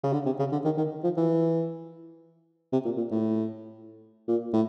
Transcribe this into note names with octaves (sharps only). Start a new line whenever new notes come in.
C#3
D3
C3
C#3
D3
D#3
D#3
F3
E3
C3
A#2
A#2
A2
A#2
A2